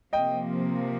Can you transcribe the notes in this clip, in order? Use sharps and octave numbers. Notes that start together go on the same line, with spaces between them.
C3 F3 A#3 D#5 G5